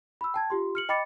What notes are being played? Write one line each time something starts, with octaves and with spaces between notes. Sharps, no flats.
B5 E6
G5 A5 G#6
F4 G4 C6
F6 C#7 F#7
D#5 G5 B5 D6 A6 C#7